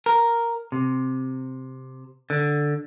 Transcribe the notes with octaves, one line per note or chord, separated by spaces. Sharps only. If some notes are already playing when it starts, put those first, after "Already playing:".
A#4
C3
D3